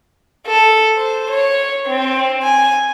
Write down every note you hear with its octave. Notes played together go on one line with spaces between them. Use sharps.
A4
C5
C#5
C4
G#5